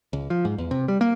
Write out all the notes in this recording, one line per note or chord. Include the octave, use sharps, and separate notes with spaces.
C#2
F3
G#2
E2
C3
G3
A#3